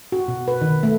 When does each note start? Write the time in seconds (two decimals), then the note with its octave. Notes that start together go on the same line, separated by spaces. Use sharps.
0.12 F#4
0.28 B2
0.48 B4
0.61 D#3
0.83 A3